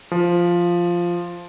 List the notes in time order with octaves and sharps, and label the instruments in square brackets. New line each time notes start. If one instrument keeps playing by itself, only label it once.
[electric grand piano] F3